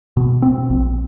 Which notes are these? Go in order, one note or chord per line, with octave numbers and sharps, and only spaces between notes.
B2
C4
A#1